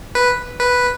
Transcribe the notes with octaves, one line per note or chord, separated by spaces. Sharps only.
B4
B4